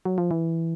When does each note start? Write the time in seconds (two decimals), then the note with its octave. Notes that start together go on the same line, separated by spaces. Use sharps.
0.05 F#3
0.18 F3
0.31 E3